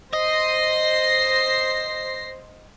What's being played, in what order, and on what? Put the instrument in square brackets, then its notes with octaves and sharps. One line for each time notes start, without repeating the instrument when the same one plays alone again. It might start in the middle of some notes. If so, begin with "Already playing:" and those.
[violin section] C5 A#6 C7 [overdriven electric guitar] D#5